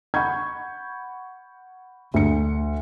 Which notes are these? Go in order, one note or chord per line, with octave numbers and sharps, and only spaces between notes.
F#5 B5 C#6 G6 G#6
D2 C#7